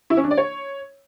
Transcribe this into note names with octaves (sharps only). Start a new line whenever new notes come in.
E4
C#4
D4
D5
C#5